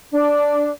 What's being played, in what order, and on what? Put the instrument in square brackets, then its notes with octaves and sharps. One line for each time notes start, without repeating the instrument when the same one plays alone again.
[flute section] D4